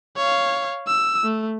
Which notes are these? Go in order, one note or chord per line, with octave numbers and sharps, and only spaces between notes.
C#5 F5
E6
A3